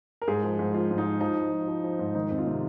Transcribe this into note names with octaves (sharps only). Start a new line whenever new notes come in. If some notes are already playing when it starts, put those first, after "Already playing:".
A#4
G#2 G#4
F3
G#2
F3 F4
G#2
D#4
F3
F3 D#4
F3
F3
F3
F3
G#2
D#3 D#4
F2
F4
C3